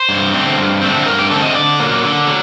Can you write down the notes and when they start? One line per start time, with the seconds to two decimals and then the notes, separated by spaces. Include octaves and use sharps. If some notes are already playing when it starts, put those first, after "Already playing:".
Already playing: C5
0.09 G2
0.33 D3 A3 C4
0.57 G2
0.82 D3 A3 C4
1.05 G2 A#4
1.19 G4
1.30 D3 A3 C4 A4
1.42 D#5
1.55 D3 D5
1.80 F#3 A#3
2.03 D3
2.27 F#3